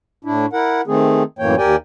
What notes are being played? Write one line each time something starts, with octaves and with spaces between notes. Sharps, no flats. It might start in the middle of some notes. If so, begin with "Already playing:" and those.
A2 D4 E4
E4 A#4 F#5
D#3 A3 C4 G#4
F#2 A2 E3 A#3 C#5 G5
D#2 G4 A#4 D5 G5 G#5